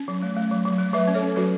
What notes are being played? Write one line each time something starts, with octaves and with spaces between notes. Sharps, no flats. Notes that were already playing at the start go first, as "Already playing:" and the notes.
Already playing: C#4
F#3
A3
A3
F#3
F#3
A3
F#3 B4 E5
C#4
A4 C#5
C#4
F#3 F#4 B4